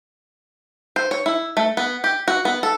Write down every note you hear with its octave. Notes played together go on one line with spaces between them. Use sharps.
C5
C#5
E4
A3
B3
G4
F#4
B3
A4